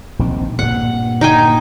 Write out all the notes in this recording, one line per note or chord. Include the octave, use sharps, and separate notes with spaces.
A#1 D#3 C4
G2 A#2 F#5
D#4 G5 G#5